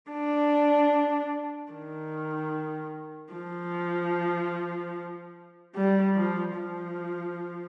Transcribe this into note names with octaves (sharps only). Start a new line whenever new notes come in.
D4
D#3
F3
G3
F3
F3